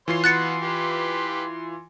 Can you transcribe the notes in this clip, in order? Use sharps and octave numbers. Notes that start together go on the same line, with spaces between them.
E3 F4 C#5 C6 C7
B3 F#4 B4 C6 F#6 A6 C#7
G4 B4